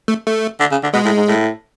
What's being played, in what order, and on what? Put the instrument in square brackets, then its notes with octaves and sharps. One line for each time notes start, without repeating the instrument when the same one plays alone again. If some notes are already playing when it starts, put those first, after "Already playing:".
[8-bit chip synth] A3
A3
[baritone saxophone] D3
C#3
D3
[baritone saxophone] B2 [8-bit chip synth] G#3
[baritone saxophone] A2
G#2
A2